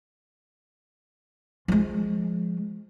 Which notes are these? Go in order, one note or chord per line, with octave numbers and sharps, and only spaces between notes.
F3 G#3